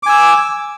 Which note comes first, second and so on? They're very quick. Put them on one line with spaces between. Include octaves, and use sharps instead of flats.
D6 G#5 E6